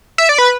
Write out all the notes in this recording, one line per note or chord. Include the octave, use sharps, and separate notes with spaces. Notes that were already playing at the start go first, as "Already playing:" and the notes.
E5
D5
B4